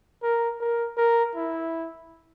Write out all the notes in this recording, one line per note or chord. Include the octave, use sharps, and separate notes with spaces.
A#4
A#4
A#4
E4